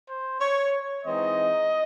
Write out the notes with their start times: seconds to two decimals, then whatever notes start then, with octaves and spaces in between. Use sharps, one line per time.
0.08 C5
0.41 C#5
1.05 E3 G#3 C4 D#4 D#5